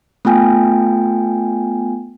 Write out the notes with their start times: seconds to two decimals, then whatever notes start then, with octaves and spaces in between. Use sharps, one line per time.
0.25 A3 B3 F4 G5 G#5